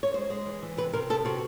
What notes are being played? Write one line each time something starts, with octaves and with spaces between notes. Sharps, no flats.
C#5
G#3 C5
G#3
E3
E3
C3 B4
C3 A#4
B3 A4
C3 F#4